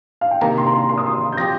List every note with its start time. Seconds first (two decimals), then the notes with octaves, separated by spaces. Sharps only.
0.21 F5
0.31 G5
0.41 C3 D#3 A#3 D#4 A#5
0.58 C6
0.67 A#5
0.73 C6
0.89 C6
0.98 D#6
1.07 C6
1.32 G6
1.37 F3 C4 G4 A#6